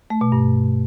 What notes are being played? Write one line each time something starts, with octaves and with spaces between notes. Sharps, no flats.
A3
B2
G2